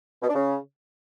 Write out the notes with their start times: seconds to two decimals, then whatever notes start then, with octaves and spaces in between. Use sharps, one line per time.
0.22 B2
0.28 D4
0.35 C#3